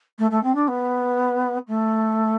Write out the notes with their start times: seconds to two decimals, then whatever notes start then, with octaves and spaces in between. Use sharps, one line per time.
0.18 A3
0.31 A3
0.43 C4
0.55 D4
0.68 B3
1.68 A3